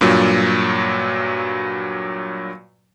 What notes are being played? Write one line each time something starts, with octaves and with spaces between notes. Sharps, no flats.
G2 A#2 F#3